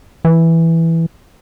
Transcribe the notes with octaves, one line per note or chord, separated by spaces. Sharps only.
E3